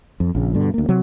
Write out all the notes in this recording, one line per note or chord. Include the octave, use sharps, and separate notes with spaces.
F2
A#1 C#3
G2 B2 D3
D2 A#3
C3 F#3